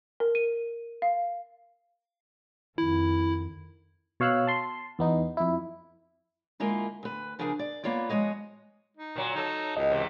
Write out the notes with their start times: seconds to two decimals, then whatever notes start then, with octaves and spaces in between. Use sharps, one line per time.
0.20 A#4
0.35 D#7
1.02 F5
2.78 F2 D#3 E4
4.20 B2 C#5 F5 E6 F#6
4.47 A5 C6
4.99 E2 B3 D#4
5.37 F2 E4
6.60 D3 G#3 A#3 E4 F4 A#4
7.03 D2 B4
7.39 C#3 F3 B3 D4 G#4 A#4
7.59 D5
7.84 A#3 B3 F4 C#5 D5
8.09 F3 G#3 F#4 C#5 D#5
8.97 D#4
9.16 A#2 F#3
9.35 F#3 D#4 A4
9.77 C#2 D#5
9.90 C3 E3